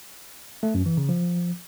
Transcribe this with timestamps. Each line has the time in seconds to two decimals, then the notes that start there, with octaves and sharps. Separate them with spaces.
0.63 A3
0.74 F#2
0.86 E3
0.97 C#3
1.09 F3